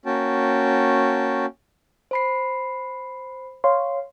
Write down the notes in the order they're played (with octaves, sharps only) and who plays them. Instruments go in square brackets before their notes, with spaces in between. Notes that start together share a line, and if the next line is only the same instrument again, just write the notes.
[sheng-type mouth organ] A#3 C#4 F#4 G5 A5
[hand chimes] C5 B5 C7
[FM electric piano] C#5 F5 C6